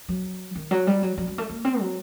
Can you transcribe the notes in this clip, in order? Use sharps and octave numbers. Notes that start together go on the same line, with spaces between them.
F#3
D#3
F#3
G3
F#3
F#3
G3
A3
A#3
C4
F#3